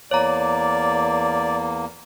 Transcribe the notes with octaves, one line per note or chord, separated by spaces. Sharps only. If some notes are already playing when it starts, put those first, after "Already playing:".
E2 A#3 C#5 D5 A#5